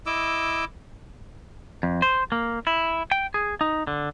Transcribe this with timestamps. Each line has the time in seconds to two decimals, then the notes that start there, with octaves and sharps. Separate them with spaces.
0.06 E4 D#5 D6 E6
1.83 F2
2.02 C5
2.32 A#3
2.67 E4
3.12 G5
3.34 G#4
3.61 D#4
3.87 D3